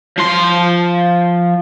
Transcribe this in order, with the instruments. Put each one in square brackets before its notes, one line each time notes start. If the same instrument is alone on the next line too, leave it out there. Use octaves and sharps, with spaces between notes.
[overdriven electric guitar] F3 C6